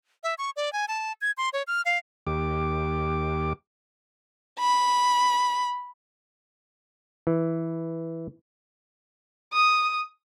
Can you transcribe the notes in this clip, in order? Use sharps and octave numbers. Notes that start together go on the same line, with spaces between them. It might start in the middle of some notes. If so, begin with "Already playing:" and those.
E5
C#6
D5
G#5
A5
G#6
C6
C#5
F6
F5
D#2 G4 D6
B5
E3
D#6